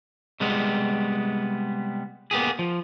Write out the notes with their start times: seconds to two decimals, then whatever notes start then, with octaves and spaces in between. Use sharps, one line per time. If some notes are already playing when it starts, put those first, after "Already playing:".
0.40 C3 G3 G#3 B3
2.31 A#3 B3 G4 G#4
2.59 F3